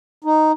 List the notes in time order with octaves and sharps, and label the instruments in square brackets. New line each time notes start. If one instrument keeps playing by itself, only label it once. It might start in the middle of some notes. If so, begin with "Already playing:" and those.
[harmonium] D#4